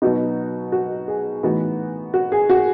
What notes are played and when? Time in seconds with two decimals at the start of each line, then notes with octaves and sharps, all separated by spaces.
0.02 B2 F#3 B3 D#4 F#4
0.72 F#4
1.08 G#4
1.43 A2 E3 B3 D#4 F#4
2.14 F#4
2.32 G#4
2.50 F#4